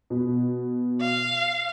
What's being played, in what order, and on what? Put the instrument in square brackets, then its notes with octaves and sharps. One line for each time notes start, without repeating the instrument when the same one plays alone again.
[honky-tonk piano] B2
[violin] F5